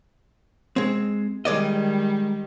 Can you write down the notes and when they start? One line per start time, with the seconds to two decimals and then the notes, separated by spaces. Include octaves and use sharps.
0.76 G#3 C4
1.45 D#3 G3 G#3 D5 D#5